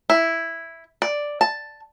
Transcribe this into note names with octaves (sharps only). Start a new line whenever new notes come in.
E4
D5
A5